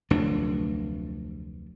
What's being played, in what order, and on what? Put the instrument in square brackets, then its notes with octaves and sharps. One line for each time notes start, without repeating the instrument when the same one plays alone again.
[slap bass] F1 D2 F#3 D4